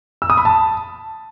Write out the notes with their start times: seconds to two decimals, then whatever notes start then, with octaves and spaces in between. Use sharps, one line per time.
0.22 E6
0.30 D#6
0.37 B5
0.45 A5